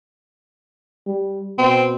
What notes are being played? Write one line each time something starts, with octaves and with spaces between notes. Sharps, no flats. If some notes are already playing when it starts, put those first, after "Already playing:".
G3
B2 C4